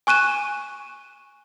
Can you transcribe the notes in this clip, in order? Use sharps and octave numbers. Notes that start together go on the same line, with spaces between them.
G#5 C#6 F#6 D#7 E7